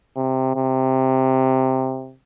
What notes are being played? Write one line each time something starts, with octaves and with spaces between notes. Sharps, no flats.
C3
C3